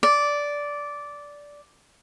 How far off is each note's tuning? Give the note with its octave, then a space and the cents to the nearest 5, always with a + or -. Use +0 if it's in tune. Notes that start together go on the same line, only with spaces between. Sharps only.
D5 -10